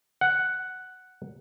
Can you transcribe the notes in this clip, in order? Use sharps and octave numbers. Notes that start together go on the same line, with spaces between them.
F#5